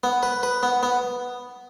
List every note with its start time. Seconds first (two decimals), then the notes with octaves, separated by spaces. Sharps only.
0.04 B3
0.23 B4
0.43 B4
0.63 B3
0.83 B3